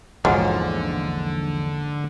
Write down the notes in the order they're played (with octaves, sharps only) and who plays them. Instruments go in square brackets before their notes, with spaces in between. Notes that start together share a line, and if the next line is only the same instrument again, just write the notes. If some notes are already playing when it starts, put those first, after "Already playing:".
[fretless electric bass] A#1 E2 [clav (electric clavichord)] G#2 F4 [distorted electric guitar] D3 [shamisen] F#3